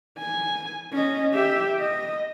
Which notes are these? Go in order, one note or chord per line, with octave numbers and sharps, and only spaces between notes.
G#5
C#4 D#5
G4 E5
D#5